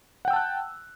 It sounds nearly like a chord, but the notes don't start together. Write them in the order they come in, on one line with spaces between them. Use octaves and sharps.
F#5 G5 E6 A5 F#6